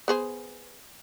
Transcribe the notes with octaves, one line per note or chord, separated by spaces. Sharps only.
B3 G#4 C5